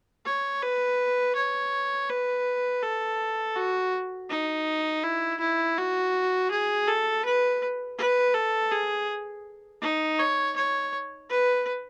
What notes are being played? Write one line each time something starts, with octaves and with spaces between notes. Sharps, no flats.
C#5
B4
C#5
B4
A4
F#4
D#4
E4
E4
F#4
G#4
A4
B4
B4
A4
G#4
D#4
C#5
C#5
B4